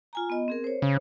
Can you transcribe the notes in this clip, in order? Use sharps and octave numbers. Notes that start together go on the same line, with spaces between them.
F4 G#5 A#5
B3 D#5
C4 G#4 A#4
C5 C#5
C#3